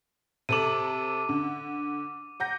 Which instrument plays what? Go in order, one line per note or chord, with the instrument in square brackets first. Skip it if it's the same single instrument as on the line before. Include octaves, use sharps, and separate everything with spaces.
[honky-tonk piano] C3 A4 F#7 [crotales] D6 D#7
[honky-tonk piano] D3
F#5 G6 A#6